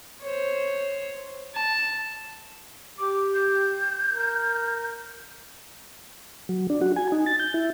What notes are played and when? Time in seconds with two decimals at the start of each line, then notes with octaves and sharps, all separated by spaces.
0.22 C5 C#5
1.55 A5
2.98 G4 D6
3.34 G6
4.09 A#4
6.49 F#3
6.70 D4
6.81 F#4
6.96 G#5
7.12 D#4
7.26 A6
7.39 G6
7.54 E4